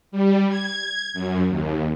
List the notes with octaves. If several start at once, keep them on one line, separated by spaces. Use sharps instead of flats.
G3
G#6
F#2
D#2